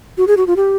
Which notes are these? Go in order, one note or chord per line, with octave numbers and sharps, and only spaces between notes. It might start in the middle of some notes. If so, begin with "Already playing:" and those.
F#4
G#4
F#4
F4
G4